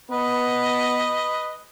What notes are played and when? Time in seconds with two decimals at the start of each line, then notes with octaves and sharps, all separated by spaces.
0.10 B3 B4 D#5